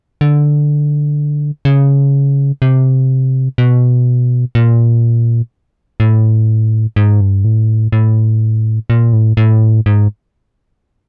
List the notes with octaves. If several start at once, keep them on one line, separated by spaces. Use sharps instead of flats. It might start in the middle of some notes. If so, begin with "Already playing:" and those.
D3
C#3
C3
B2
A#2
A2
G#2
G2
A2
A2
A#2
A2
A2
G#2